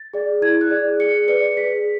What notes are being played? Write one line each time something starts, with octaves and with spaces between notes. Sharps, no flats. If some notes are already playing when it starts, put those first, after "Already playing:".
Already playing: A6
G#4 D5
E4 G#6
F#6
G#4 D5
G#4 C#7
B4 D5 C#7
G#4 B6